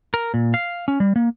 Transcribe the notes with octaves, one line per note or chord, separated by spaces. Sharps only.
A#4
A#2
F5
C#4
G3
A#3